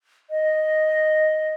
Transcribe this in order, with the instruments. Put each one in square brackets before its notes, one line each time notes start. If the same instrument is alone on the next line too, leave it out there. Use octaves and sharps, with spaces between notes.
[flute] D#5